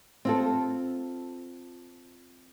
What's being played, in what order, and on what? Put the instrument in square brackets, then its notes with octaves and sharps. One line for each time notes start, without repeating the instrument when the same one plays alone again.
[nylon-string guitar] C4 F4 A4